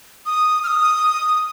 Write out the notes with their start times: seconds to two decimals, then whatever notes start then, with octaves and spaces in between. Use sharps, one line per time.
0.26 D#6
0.64 F6
0.67 D#6